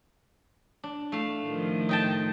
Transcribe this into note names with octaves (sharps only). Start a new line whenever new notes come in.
D4
A3 F5
A2 D#3 F3
D#4 G5 A5